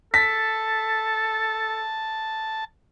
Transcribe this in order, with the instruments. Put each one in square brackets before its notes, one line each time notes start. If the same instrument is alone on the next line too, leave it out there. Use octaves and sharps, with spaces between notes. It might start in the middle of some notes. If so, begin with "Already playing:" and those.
[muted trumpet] A4 [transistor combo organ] A5 [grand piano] B6